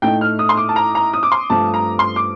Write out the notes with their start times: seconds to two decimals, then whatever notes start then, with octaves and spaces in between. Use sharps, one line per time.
0.02 A2 A3 D#4 G5
0.21 F6
0.39 D#6
0.49 C6
0.57 D6
0.69 A5
0.76 A#5
0.95 A#5
1.13 D#6
1.23 D6
1.32 C6
1.50 G2 F3 A3 C4 A5
1.74 A#5
1.99 C6
2.16 D6